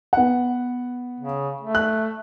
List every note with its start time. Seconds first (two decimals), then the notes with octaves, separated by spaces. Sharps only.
0.13 B3 F#5
1.20 C#3
1.61 A3
1.75 F#6